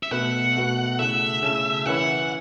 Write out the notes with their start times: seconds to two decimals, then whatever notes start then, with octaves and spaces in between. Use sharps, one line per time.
0.03 E5
0.11 B2 A3 F#4 B4 F#5
0.55 B2 A3 F#4 B4
0.99 C#3 A3 E4 A4 E5
1.43 C#3 A3 E4 A4
1.86 E3 C#4 E4 B4 F#5